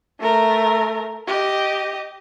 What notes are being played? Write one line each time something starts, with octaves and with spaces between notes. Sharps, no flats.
A3 A#4
G4 D#5